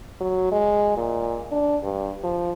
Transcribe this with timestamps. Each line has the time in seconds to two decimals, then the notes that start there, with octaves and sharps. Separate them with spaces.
0.21 F#3
0.51 G#3
0.97 A#2
1.52 D4
1.83 G2
2.24 F3